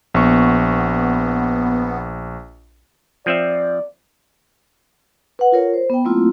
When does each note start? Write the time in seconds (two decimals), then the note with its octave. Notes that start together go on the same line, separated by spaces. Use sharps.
0.14 A#1 B3 C#6
3.26 F3 C4 D5 E5
5.39 B4 F#5
5.52 F4 A#4 C#5
5.74 C5
5.90 B3 G5
6.05 F#3 A3 A#3 C4 E4 F4